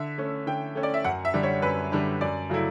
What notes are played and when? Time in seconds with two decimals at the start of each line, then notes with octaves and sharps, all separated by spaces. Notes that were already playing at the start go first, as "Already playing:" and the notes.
Already playing: D3 E5
0.18 A3 C#4
0.47 D3 G5
0.75 A3 C#4
0.83 D5
0.94 E5
1.04 F#2 F#5
1.25 E5
1.34 D3 G3 D4
1.43 C#5
1.62 F#2 B4
1.92 D3 G3 D4
2.21 F#2 D5
2.50 C#3 F#3 A3 E4